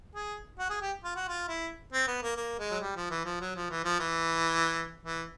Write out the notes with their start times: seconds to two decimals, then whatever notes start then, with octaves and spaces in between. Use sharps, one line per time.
0.15 G#4
0.59 F#4
0.70 G#4
0.82 G4
1.04 F4
1.16 F#4
1.28 F4
1.48 E4
1.92 C4
2.07 B3
2.22 A#3
2.36 A#3
2.59 G#3
2.71 F#3
2.81 G3
2.96 F3
3.11 E3
3.25 F3
3.40 F#3
3.55 F3
3.70 E3
3.84 F3
4.00 E3
5.03 E3